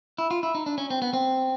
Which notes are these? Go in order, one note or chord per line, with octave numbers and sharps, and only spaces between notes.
E4
F4
E4
D#4
D4
C#4
C4
B3
C4